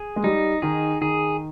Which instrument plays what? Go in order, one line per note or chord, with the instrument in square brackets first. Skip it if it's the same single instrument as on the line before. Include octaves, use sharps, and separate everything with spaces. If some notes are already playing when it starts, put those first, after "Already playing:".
Already playing: [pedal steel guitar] G#4
[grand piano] G#3
[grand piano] G3 [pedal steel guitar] D#4
[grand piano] D#3 [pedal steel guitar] G#4
[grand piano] D#3 [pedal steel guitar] G#4